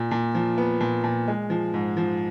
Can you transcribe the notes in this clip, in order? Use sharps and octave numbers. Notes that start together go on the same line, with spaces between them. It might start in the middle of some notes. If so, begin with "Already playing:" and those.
Already playing: A#2
A#2
F3
B3
A#2
A#2
G#3
F3
G#2
F3